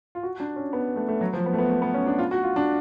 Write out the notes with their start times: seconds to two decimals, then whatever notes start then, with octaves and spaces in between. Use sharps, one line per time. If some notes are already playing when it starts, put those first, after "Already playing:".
0.15 F4
0.23 F#4
0.40 D4
0.56 C#4
0.73 B3
0.96 A3
1.08 A3
1.21 F#3
1.33 F3
1.46 B3
1.53 A3
1.58 B3
1.70 A3
1.82 B3
1.94 C#4
2.07 D4
2.19 F4
2.31 F#4
2.43 F4
2.56 D4